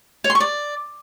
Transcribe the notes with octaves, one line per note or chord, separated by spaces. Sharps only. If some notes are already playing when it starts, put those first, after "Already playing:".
C#5
C6
C#6
D5